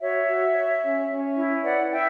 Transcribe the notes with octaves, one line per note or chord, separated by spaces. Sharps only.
F#4 C#5 E5
F#4
C#5
C#4
C#4
E4
B4 D5 F#5
E4 E5 G5